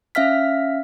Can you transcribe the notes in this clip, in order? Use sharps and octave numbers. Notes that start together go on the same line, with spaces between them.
C#4 E5 F5 F6 B6